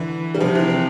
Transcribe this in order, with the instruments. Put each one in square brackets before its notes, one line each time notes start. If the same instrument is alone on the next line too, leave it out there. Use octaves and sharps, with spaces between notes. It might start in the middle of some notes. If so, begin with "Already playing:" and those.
Already playing: [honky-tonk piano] D3 [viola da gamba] E3
[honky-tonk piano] G3
[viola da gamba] C3 [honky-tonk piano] F3
[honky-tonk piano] E3
C4